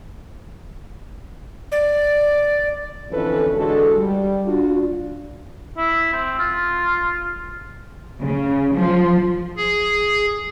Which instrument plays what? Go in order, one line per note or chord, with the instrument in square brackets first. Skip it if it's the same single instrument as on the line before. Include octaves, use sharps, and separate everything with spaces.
[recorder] D5
[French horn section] F2 D3 E3 C#4 A4 B4
D3 E3 G#3 F#4 A4
G3
D4 F4 F#4
[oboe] E4
C4
F4
[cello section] C#3
F3
[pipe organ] G#4